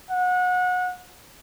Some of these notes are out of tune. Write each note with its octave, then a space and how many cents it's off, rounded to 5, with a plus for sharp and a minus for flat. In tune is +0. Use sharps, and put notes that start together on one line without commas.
F#5 -30